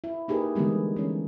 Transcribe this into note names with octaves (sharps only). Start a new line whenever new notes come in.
E4
A#3 D#4 G4 G#4 A#4 B4
D3 E3 G3 G#3 B3
E3 C#4